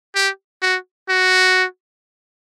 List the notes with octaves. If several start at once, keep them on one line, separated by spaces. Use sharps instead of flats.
G4
F#4
F#4